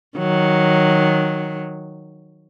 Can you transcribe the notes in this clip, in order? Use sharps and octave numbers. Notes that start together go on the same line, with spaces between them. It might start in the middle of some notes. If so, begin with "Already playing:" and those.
D#3 F#3